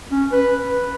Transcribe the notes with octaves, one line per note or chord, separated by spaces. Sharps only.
C#4
B4
B4